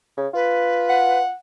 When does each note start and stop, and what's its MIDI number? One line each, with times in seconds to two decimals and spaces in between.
0.17 0.28 49
0.34 1.29 65
0.34 1.19 71
0.89 1.34 78